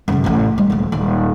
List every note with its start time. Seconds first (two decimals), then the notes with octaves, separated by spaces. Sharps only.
0.08 F#2 C#3
0.24 A1 C#4
0.58 G3
0.70 D#1 D2
0.92 D#1